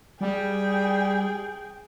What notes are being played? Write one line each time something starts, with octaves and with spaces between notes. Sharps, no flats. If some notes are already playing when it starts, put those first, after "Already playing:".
G3 G#4 G5